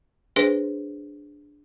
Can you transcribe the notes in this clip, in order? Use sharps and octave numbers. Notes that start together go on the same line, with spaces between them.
D4 G#4 B4 C5